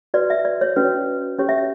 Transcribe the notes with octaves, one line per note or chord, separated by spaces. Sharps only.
F#4 B4 D5
E5
D5
C#5
C#4 F#4 B4
C#4 G4 C#5
E5